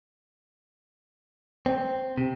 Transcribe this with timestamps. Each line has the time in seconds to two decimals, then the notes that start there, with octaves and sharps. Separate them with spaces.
1.66 C4
2.18 C3